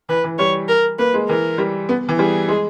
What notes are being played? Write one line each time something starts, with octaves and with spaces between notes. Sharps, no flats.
E3 B4
E3
G3 C#5
A#4
A#3 B4
G#3
E3 A#4
G3
B3
E3
G3 G#4
G#3